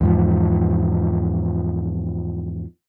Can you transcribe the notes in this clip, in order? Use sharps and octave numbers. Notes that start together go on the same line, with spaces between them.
E2 G#2 F3